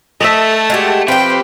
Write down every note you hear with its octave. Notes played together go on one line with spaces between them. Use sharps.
A3 A4 D#5 E5
G#3 F#4 G4
F3 C4 G4 B4 G5